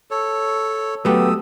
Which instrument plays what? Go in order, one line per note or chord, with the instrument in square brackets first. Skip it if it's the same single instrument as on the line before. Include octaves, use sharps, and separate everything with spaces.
[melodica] A4 C#5
[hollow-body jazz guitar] F#3 A3 [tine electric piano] B3 G4 B4 [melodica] D#6 E6